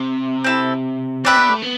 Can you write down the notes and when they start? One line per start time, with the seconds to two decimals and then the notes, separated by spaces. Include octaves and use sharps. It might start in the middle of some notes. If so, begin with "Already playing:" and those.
Already playing: C3
0.44 C4 E4 A4
1.25 C4 D4 G4 B4 E5
1.37 B3
1.49 A3
1.62 B3